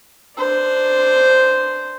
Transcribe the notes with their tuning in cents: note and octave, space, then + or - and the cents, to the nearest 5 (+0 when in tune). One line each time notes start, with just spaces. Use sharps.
D4 +0 C5 -5